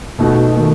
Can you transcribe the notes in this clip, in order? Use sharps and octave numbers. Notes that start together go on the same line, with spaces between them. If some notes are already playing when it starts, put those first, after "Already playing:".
B2 A3 D#4 F#4
D#3 A3